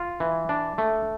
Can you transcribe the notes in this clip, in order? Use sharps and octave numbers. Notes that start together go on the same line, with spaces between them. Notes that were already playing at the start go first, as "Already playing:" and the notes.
Already playing: F4
E3
D4
A3